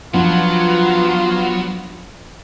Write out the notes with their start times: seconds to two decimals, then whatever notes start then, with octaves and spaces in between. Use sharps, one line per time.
0.14 F3 F#3 B3 D4 F4